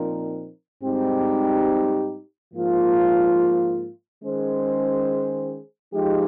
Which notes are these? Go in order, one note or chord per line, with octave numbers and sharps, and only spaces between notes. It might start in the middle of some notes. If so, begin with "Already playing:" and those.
Already playing: A#2 F3 C4 D#4 A#4
G#2 G3 C4 D#4 G4
G#2 F3 A#3 F4
D#3 G#3 C#4 G#4 C5
F3 G#3 D#4 G4